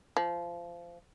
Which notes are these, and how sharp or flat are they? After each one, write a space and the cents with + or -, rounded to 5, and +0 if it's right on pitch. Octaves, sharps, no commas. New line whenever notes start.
F3 -20